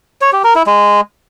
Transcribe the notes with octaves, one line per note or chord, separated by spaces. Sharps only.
C#5
G4
A#4
E4
G#3